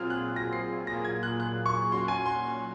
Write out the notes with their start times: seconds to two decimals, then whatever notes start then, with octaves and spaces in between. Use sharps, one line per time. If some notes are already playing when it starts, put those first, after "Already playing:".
Already playing: A#2 F#3 C4 F4 G#4 F6
0.10 F#6
0.36 A#6
0.53 C7
0.87 A#2 F#3 A#3 F4 G#4 A#6
1.05 G#6
1.23 F#6
1.40 F#6
1.66 C#6
1.92 A#2 F#3 C#4 F#4 C6
2.08 G#5
2.26 C6